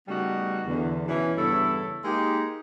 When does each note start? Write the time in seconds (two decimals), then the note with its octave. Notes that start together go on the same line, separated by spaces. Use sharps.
0.08 C#3 G3 A3 B3 D#4 F#4
0.66 E2 D3
1.08 B2 E3 C#4
1.36 E2 G2 C#3 E4 A4 C#5
2.04 G#3 A#3 D#4 G4